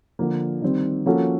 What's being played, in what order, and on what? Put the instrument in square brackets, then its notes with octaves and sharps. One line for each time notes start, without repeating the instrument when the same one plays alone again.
[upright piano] D3 F3 A#3
D#3 G3 C4
F3 A#3 C#4 F#4 A4